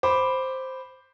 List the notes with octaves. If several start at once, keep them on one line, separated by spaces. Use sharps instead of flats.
C5 B5 D6